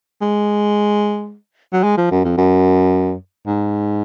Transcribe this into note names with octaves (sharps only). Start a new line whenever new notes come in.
G#3
F#3
G#3
F3
F#2
F2
F#2
G#2